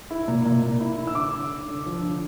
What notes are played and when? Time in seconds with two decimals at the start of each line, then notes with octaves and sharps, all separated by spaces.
0.10 E4
0.28 A#2
0.45 A#2
0.63 A#2
0.80 E4
0.98 E4
1.07 E6
1.15 D3 D6
1.33 D3
1.51 D3
1.68 D3
1.86 F3
2.03 D3